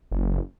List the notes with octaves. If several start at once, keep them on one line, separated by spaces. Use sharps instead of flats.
F#1